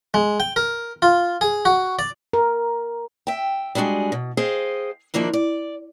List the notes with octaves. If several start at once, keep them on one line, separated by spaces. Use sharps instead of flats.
G#3
G5
A#4
F4
G#4
F#4
D5
A#4
E5 G5
G3 G#3 D4 F#4 G#4
B2
G#4 C5 D#5 F5 G5
D#3 F3 A#3 D4 E4
D5